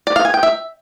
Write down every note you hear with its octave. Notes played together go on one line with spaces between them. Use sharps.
D5
F5
G#5
G5
E5